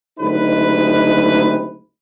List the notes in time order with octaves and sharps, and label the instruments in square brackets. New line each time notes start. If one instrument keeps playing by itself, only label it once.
[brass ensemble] F#1 D2 C3 G#3 D#4 B4